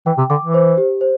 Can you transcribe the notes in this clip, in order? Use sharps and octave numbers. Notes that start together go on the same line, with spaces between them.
E3 G5
C3
D3 D6
E3
C5
G4
C5